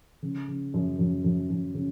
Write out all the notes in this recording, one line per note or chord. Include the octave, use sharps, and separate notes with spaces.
C#3
C#3
F#2
F#2
F#2
F#2
C#3